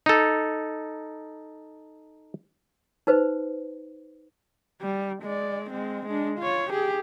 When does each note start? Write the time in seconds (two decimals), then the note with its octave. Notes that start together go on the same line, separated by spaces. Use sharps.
0.06 D#4 A4
3.07 D#4 B4 C5
4.81 G3
5.22 G#3 D5
5.70 G#3 C4
6.06 G#3 D4
6.39 F4 C#5
6.70 G4 G#4